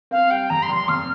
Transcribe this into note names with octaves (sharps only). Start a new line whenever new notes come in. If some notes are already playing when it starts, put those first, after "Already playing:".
C4 F5
G3 G5
F2 A#5
C6
F1
C6
F2 F6